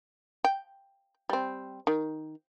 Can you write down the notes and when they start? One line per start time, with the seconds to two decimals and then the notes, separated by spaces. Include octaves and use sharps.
0.44 G5
1.29 G3 C4
1.87 D#3